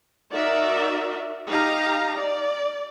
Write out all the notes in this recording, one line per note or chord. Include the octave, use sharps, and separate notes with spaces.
D#4 F#4 A#4 D5 E5
D#4 G4 F5 A#5
D5